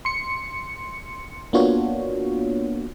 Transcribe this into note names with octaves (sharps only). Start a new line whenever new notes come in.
C6 C#7
A#3 B3 D4 F4 F#4 C#5